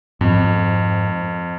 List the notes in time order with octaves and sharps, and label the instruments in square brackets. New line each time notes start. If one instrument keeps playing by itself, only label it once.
[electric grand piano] F2 [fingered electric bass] G#2 C4